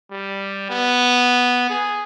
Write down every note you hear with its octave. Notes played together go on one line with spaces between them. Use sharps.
G3
B3
G#4